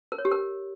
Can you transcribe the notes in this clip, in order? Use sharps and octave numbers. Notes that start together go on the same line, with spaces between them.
A#4
C#5
G4
A#4